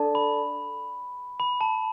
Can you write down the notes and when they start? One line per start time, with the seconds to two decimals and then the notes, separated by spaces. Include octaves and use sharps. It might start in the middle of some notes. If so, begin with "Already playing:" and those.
Already playing: D4 A4 D5 A5
0.15 B5
1.40 B5
1.61 A5